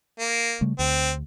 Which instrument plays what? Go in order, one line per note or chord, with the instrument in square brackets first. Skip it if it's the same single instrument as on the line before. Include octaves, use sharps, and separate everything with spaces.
[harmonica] A#3
[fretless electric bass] C#3 G3 A3
[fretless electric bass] D2 [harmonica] C4